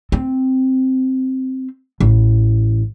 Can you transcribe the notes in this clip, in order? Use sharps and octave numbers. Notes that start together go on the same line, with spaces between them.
C4
A1